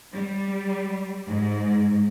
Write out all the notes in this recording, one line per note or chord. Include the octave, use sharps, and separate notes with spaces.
G3
G#2